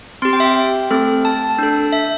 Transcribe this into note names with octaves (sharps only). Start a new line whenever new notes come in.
C4 G4 C6
G5
E5
G5
G5
A3 C4 A4
A5
D4 A4
E5